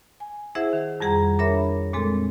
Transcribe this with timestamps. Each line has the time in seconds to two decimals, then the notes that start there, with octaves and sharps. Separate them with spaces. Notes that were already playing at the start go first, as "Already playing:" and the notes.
0.20 G#5
0.55 E4 G#4 C5 E5 F#5
0.73 D#3
1.00 F2 G3 G#4 F#5 A#5
1.39 D4 A#4 C#5 E5 B5
1.93 A#2 G#3 C4 A4